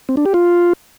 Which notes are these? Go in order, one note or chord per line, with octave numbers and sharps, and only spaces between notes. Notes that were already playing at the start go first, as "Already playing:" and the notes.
C4
D4
G4
F4